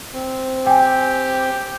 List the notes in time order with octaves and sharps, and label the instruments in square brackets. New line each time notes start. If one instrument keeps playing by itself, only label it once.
[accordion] C4
[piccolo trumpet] G4 [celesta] G5 G#5